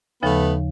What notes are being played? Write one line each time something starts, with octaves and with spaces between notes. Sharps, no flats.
D#2 C#3 F3 A3 B3